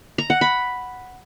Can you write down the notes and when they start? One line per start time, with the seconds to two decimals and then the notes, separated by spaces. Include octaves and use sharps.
0.18 A#5
0.30 F#5
0.41 B5